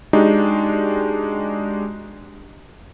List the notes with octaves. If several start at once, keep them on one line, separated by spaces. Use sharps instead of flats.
G#3 D4 D#4 F#4 G4